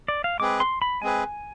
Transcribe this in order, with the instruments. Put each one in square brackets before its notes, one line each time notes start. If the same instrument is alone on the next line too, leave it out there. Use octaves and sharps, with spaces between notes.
[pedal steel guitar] D5
F5
[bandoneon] G#3 C4 G#4 B4 [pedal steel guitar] D6
[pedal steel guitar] C6
B5
[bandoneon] G#3 C4 G#4 B4 [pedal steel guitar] G#5